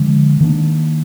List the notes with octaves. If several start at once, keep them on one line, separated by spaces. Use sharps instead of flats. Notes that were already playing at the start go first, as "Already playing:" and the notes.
Already playing: D3 F3 G#3
D#3 A#3 D4